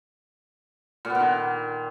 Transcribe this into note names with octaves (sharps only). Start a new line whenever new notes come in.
A#2
B3
A#2
D#3